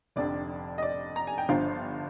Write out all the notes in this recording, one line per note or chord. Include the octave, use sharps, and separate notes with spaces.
F1 F2 D3 D5
D#5
D5
A#5
G#5
G5
G1 G2 D3 F3 F4 F5